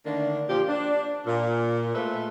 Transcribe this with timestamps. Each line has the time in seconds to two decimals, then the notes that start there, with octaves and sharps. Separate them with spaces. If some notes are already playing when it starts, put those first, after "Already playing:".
0.06 D3 D#3 A3 A#3 D4
0.49 A#2 F3 G4
0.69 D4
1.26 A#2
1.95 G#3 A3 F4 B4 C5 E5